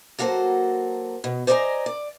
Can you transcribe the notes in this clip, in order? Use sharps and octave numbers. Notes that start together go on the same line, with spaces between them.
F#3 A#3 F#4 A4 C5
B2
C5 D5 D#5 G5 G#5 A#5
D5